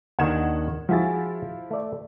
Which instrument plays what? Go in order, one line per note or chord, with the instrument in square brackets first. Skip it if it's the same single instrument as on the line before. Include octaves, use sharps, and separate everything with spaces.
[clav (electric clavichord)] D#2 D#3 D4 [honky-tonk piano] F#5 G#6 E7
[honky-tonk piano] F3 E4 A6 [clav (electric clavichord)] F#4 G#4
[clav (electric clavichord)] A3 D5